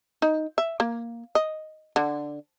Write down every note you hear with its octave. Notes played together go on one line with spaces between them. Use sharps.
D#4
E5
A#3
D#5
D3